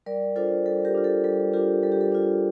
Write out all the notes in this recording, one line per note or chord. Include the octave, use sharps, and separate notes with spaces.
G3 A#4 D5
D4 F4 A4 C5
G3 A4
G4 A#4
D4 F4
A4
G3 A4
D4 F4 G4 A#4
G3 A4
G4
A4
D4 F4